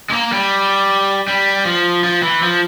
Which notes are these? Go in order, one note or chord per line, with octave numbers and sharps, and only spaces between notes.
G#3
A#3
G3
G3
F3
F3
E3
F3